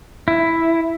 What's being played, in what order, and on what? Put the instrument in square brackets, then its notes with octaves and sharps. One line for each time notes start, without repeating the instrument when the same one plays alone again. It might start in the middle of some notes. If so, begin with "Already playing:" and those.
[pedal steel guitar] E4